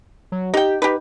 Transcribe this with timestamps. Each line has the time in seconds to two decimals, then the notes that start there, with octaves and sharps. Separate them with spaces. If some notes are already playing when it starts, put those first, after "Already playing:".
0.32 F#3
0.54 D#4 G4 G5
0.82 D#4 G4 B4